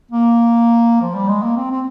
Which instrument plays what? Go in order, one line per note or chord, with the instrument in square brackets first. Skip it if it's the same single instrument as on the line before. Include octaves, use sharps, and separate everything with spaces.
[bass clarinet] A#3
F3
G3
G#3
A#3
C4
C4